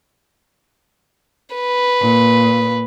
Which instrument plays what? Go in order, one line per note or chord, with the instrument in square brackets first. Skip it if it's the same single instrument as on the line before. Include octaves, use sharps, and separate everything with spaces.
[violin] B4
[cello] A#2